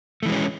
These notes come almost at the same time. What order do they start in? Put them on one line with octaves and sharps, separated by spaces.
A3 E3 G#3 C#4